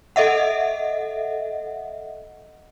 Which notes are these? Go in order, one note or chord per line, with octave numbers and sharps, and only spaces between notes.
A4 D#5 E5 F#5